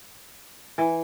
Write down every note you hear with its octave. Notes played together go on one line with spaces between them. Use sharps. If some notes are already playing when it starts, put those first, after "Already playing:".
E3